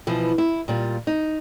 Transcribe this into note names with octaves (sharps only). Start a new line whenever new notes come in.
B2 E3 F3
E4
A#2 G3 F4
D#4